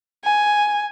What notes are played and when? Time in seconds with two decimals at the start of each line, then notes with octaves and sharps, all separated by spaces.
0.24 G#5